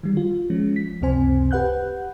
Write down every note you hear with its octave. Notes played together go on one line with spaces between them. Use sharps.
D#3 G3
F4
F3 G#3 C#4
B6
C#2 F#2 C3 C4 C5 G#5
G4 B4 F#5 F#6 G6